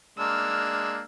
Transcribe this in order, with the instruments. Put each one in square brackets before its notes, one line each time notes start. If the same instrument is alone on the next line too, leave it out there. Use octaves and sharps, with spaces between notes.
[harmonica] G#3 A#3 D4 [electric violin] E6 F6